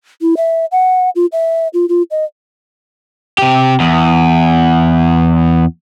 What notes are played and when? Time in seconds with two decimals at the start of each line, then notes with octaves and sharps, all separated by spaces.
0.22 E4
0.37 E5
0.72 F#5
1.16 F4
1.32 E5
1.74 F4
1.89 F4
2.11 D#5
3.38 C3 G4
3.80 E2